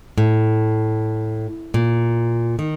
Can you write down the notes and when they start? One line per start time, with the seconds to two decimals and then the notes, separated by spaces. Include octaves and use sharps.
0.18 A2
1.74 A#2
2.59 D#3